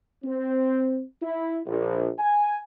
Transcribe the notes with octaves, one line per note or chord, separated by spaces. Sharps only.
C4
E4
A#1
G#5